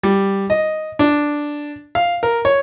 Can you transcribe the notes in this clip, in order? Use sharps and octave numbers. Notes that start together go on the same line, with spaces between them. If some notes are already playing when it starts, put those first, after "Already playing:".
G3
D#5
D4
F5
A#4
C#5